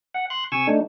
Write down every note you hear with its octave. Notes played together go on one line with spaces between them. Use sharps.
F#5
C6 F#6
C3 G#5 C#6 E6
A3 D4 D#4